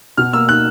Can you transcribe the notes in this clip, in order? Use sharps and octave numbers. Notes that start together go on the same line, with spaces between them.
B2 F6
A#3 E6
D#4 F#6